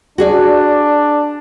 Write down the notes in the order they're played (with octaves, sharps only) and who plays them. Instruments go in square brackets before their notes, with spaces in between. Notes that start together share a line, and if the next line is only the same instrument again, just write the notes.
[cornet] D4 [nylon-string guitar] F#4 G#4 D5